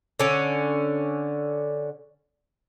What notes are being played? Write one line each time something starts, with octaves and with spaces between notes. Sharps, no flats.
D3 C#4